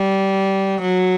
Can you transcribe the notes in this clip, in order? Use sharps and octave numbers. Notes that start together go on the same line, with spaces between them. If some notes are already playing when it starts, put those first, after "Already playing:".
Already playing: G3
F#3